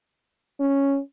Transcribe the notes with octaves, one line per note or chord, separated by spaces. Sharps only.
C#4